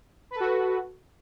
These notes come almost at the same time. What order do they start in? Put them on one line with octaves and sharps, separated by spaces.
B4 A4 F#4